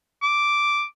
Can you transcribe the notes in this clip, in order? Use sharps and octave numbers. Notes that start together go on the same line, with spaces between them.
D6